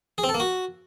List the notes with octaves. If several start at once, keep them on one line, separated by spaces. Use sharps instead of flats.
G#4
C4
A4
A#3
F#4